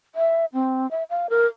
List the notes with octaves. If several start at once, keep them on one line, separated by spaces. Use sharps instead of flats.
E5
C4
E5
F5
A#4